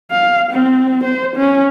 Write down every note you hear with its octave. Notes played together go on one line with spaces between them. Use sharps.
F5
C4
C5
C#4